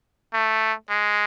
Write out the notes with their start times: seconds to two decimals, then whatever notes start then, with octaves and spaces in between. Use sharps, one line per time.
0.34 A3
0.90 G#3